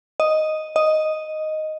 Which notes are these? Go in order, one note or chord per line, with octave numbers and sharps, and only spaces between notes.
D#5
D#5